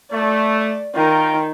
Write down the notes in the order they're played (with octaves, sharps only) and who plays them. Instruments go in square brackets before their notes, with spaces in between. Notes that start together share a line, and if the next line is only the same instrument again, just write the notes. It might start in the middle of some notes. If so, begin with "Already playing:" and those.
[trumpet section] A3 [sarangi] D5
[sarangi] D#3 [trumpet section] F4 A#4 G5